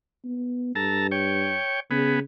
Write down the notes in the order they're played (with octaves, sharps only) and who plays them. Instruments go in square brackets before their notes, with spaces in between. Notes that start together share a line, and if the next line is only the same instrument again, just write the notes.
[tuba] B3
[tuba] G2 [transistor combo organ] A4 A5 A#5
[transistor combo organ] C#5 G5
[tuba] C#3 [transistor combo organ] B3 G#4